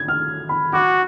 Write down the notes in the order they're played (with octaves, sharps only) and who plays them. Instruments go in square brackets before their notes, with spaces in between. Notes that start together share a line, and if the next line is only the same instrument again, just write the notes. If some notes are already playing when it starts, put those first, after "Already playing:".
Already playing: [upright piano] G#6
F6
B5
[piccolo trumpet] F#4 [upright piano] D6